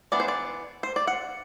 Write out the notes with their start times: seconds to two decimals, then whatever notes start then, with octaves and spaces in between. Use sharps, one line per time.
0.12 E3 B3 D4 D5
0.20 C5
0.28 D5
0.83 C5
0.96 D5
1.07 F#5